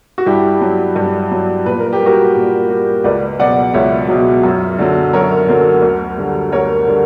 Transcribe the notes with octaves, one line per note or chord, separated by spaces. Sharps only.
F#4
G2 E4 G4
F#3
G2
F#3
A#2 B4
A#4
G4
G3
F#4 A#4
A#2
G3
C#2 B4 D5
B2 F#3 D5 F#5
C#2 C#5 E5
B2 F#3
F#2
D3 F#3
F#2 A#4 C#5
D3 F#3
D2
D3 G3
D2 A#4 C#5
D3 G3